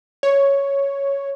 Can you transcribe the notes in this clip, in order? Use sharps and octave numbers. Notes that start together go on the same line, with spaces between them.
C#5